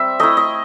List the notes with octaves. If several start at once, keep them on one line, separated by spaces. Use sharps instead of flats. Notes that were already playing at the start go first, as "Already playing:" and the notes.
Already playing: G3 C4 E5
A3 E4 D#5
D#5